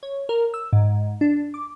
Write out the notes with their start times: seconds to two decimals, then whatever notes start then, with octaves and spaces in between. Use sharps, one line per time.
0.03 C#5
0.29 A#4
0.54 E6
0.73 G#2
1.21 D4
1.54 D6